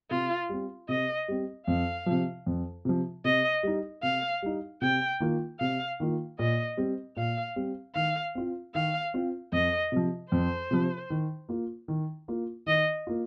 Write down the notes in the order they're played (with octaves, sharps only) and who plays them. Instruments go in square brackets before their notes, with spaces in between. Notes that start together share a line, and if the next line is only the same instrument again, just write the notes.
[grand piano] C3 [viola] F4
[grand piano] G3 C4
[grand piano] C3 [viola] D#5
[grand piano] G3 C4
[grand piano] F2 [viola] F5
[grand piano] C3 F3
F2
C3 F3
[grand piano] C3 [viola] D#5
[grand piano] G3 D#4
[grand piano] C3 [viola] F5
[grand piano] G3 D#4
[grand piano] C3 [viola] G5
[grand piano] D#3 A#3 F4
[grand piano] C3 [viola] F5
[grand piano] D#3 A#3 F4
[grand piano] A#2 [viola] D#5
[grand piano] G3 C4
[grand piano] A#2 [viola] F5
[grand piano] G3 C4
[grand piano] D#3 [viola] F5
[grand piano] C4 F4
[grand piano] D#3 [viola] F5
[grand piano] C4 F4
[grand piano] F2 [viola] D#5
[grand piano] C3 F3
[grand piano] F2 [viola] C5
[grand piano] C3 F3
D#3
A#3 F4
D#3
A#3 F4
[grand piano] D#3 [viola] D#5
[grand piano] A#3 F4